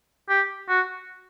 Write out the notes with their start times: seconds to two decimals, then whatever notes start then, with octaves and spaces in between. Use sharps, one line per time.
0.29 G4
0.69 F#4